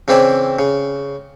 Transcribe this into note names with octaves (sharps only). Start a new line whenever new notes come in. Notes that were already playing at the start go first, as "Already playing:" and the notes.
C#3 E3 C4 E4 D5 A5
C#3